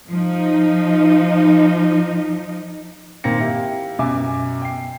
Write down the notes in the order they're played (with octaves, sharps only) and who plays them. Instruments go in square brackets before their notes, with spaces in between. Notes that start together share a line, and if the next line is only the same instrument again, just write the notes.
[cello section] F3 D#4
[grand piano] A#2 D#3 A#3 C4 A#6 C#7
E4 G4 F5
F#2 B2 E5 G#5 D6
G5 C7